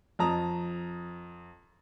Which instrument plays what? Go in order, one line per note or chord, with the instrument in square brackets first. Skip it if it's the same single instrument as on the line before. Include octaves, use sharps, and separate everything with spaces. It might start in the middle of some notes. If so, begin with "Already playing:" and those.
[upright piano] F2 A5 A#5 D#6